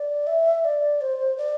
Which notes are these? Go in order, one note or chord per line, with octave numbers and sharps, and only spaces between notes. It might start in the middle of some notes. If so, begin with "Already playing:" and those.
Already playing: D5
E5
D5
C5
D5